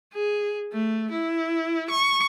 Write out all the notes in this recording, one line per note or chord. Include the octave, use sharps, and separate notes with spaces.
G#4
A3
E4
C#6